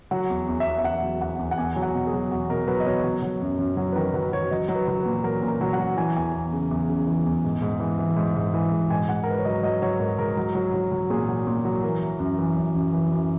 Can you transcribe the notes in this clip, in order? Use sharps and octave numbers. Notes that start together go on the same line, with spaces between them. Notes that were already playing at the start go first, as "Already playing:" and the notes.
F#3 F#5
E2
E2
E5
E2
E5
E2 F#5
F#3
E2 F#5
E2
F#5
E2 G#5
F#3
F#5
B2
G#4
F#3
E2 F#4
B2 A#4
F#3 B4
D#5
B2 C#5
F#3
F#3
F#2
F#2
F#3 C#5
B4
D#3 A#4
F#3 B4
F#3 C#5
F#3 D#5
F#3
B4
F#3
B4
A#2
F#3 A#4
A#2
A#4
F#3
F#5
F#3
E3 G#5
E2 G#5
E2
C#3
E2
C#3
E3
E2
G#2
G#2
E3
E3
G#2
G#2
E3
G#2
G#2 G#5
G#2 F#5
A#4
G#2 B4
C#5
F#3 D#5
F#3 D#5
F#3 C#5
G#2 A#4
G#2 A#4
F#3
F#3
F#3
F#3
A#2 G#4
F#3
A#2
F#3
E3 A#4
E3
F#2
E3
F#2
F#2
E3
F#2